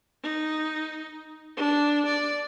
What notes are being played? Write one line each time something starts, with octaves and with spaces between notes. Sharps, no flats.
D#4
D4
D5